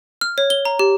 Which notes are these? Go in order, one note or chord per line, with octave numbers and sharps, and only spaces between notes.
F6
C#5
G7
A#5
G4